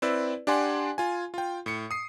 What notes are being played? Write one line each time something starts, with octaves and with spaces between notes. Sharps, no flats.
C4 E4 B4 D5 E6
D4 G4 D5 F#5 G#5 C6
F4 G#5
F4 G5
A2 C#7
D#6 C7